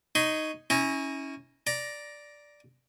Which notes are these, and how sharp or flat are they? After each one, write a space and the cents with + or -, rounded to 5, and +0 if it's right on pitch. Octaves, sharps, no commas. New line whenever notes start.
D#4 +0 C#5 +0 C6 -35
C#4 +0 E4 -35 A#5 +0
D5 +0 A#5 +10